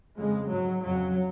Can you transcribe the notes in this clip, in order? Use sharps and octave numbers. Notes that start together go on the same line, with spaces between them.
F2 C#3 G#3
G#2 F#3
F2 C#3 F#3